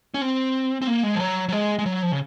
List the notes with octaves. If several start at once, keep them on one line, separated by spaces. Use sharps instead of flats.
C#4
C4
C4
A#3
G#3
F3
F#3
F#3
G#3
G#3
F#3
F3
C#3